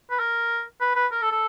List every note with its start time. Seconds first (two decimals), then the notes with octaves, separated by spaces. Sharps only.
0.10 B4
0.20 A#4
0.81 B4
0.96 B4
1.12 A#4
1.22 A4
1.32 A4